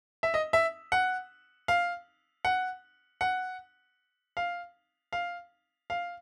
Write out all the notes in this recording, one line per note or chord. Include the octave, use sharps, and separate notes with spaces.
E5
D#5
E5
F#5
F5
F#5
F#5
F5
F5
F5